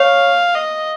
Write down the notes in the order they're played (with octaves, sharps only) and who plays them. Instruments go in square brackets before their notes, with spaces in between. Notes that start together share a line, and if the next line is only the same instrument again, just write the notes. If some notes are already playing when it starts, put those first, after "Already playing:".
Already playing: [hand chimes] C#5 [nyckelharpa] F5
[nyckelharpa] D#5